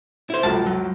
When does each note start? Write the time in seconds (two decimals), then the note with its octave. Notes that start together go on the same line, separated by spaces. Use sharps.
0.30 E4 C5
0.43 C#2 F#2 F3 A5
0.66 F#3